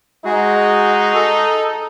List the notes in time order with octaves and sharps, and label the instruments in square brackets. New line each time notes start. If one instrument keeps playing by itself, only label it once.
[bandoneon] G#3 F#4 G#4 [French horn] D#4
[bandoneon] A4